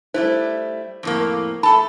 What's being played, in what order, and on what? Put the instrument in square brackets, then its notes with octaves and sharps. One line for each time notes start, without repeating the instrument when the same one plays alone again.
[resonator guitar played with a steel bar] G3 A3 E4 [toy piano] C5
[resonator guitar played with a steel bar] F2 A2 A#3
[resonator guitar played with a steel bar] A3 A4 A5 [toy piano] B5